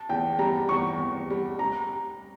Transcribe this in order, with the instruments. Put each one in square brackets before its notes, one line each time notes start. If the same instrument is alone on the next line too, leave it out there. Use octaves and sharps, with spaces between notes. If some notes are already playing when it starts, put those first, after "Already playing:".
Already playing: [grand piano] A5
[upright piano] E2 [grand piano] G5
[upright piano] G3 [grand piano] A#5
[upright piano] E2 [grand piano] C#6
[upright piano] E2
G3
[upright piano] G3 [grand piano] A#5